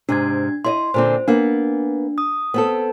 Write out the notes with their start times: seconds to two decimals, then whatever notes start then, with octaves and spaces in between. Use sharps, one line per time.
0.09 G#2 C3 D4 G#6
0.65 E4 D5 D#5 C6
0.94 A#2 D3 C4 C5
1.28 A#3 B3 D4
2.18 D#6
2.54 B3 C4 A4